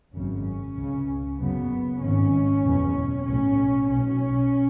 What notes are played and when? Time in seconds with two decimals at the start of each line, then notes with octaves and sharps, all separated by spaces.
0.15 G#1 F#2 C#3 C#4
0.77 C#2 C#3
1.39 F#1 F#2 C#3 B3
2.02 G#1 G#2 C#4
2.64 F#1 E2 B2
3.26 B1 A2 C#4
3.89 B1 B2 C#4